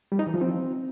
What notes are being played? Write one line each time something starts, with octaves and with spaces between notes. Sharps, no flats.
G3
D#4
E3
F3
C4